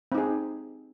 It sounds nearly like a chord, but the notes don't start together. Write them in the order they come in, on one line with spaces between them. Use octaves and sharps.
C4 D#4 G#4